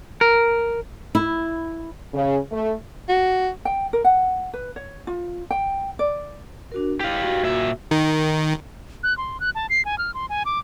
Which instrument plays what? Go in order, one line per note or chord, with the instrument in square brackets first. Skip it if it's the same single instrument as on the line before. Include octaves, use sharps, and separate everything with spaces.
[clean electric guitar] A#4
[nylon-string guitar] E4
[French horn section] C#3
A3
[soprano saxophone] F#4
[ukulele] G5
A#4
F#5
B4
C#5
F4
G5
D5
[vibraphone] D4 F#4 A#4
[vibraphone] E4 [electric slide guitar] G4 F5
[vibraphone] F#4
[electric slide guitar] A#2 E5
[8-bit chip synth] D#3
[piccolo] F#6
C6
F#6
A5
C7
G#5
F6
C6
G#5
D6